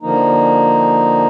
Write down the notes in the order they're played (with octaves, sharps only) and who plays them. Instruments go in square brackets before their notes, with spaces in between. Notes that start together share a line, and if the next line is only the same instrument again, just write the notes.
[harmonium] D3 F3 A#3 D#4